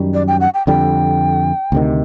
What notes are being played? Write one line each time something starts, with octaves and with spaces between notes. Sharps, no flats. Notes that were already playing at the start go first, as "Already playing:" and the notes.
Already playing: F#2 D#3 G3
D5
G5
F#5
G5
F2 D3 G3 G5
D2 C3 D#3